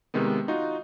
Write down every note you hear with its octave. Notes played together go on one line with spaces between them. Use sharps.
C3 D#3 G#3 B3
D#4 F4 F#4